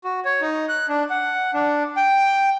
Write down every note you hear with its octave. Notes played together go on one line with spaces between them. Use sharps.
F#4
C#5
D#4
F#6
D4
F#5
D4
G5